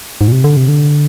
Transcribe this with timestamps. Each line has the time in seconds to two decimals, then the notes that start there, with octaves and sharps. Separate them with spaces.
0.21 G#2
0.28 A#2
0.32 C3
0.44 D3
0.57 C3
0.68 D3